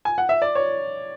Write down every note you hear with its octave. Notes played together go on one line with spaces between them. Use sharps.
G#5
F#5
E5
D5
C#5